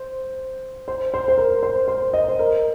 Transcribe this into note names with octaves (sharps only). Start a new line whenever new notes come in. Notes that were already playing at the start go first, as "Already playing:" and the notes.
Already playing: C5
C5
C5
C5
A#4
C5
C5
D#5
C5
A#4